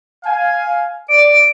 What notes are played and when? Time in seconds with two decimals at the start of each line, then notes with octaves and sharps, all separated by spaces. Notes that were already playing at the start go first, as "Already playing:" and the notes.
0.24 F5 G#5
1.09 D5 D7